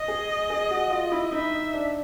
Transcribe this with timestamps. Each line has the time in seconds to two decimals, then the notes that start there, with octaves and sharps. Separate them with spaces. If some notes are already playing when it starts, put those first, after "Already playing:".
Already playing: D#5
0.08 G#4
0.50 G#4
0.71 F#4
0.91 F4
1.12 E4
1.32 D#4 E5
1.74 D4